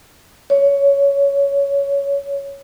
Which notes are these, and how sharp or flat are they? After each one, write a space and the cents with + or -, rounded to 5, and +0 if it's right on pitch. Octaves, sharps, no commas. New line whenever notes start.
C#5 +15